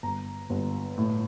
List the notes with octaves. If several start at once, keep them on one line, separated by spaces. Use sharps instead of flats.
G1 A#5
G1
A2